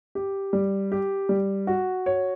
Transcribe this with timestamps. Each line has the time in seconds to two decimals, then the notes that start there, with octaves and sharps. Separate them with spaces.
0.15 G4
0.53 G3
0.92 G4
1.29 G3
1.67 F#4
2.06 C#5